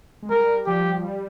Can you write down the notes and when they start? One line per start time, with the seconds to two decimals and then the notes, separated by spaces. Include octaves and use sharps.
0.22 G#3
0.30 G3 A#4
0.66 F3 G4
1.03 G3